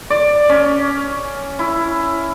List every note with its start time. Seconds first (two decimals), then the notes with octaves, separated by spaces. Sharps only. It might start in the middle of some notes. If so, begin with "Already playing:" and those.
0.10 D5
0.49 C#4
1.59 E4